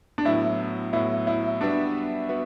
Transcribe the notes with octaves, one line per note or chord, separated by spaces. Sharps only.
D4
A2 F#3 B3 E4
A2 F#3 B3 E4
E4
G3 B3 D4 F#4 B4 E5
B3 F#4 B4 E5